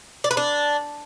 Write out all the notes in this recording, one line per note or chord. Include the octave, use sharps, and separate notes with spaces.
D5
B4
D4